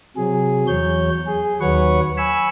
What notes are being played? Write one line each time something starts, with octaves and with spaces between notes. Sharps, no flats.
C3 F#3 G#4
E2 F#3 C#5 G6
G#4
D#2 F#3 B4 C#5 F#5 C#6
G#5 B5 C#6 E6